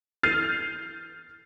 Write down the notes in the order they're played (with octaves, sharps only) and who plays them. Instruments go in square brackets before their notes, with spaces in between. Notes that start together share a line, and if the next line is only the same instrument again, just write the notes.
[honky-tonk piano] F6 G6 A6 C7 D#7 F7